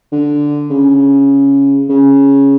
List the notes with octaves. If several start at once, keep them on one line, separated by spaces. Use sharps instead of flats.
D3
C#3
C#3